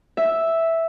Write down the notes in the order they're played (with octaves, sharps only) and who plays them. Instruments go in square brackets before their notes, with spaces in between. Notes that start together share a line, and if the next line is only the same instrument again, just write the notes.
[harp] E5